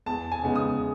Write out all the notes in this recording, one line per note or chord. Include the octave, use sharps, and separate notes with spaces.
E2 A5
G#5
C#3 G#3 B3 D#4
D#6